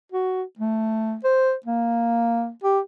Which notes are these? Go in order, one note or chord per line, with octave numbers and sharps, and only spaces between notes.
F#4
A3
C5
A#3
G4